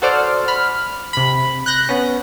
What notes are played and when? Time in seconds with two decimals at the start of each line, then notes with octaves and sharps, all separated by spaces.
0.02 F#4 A4 C5 D5 F6
0.48 B5 F6
1.13 C3 B5
1.66 F#6 G6 A#6
1.89 B3 C#4